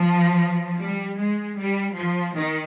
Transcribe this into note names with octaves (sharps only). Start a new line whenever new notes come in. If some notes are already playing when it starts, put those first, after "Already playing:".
Already playing: F3
G3
G#3
G3
F3
D#3